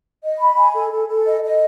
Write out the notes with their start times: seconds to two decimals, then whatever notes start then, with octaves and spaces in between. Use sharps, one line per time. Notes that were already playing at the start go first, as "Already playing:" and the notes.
0.23 D#5
0.40 B5
0.57 G#5
0.74 A4
0.92 A4
1.08 A4
1.25 D#5
1.43 D#5